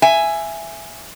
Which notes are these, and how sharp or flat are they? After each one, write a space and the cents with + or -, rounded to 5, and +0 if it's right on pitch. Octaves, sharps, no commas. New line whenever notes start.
E5 +15 G#5 +0